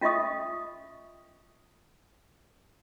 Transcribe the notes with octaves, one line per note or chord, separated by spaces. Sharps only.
C#4 F4 D#5 E5 C#6 D#6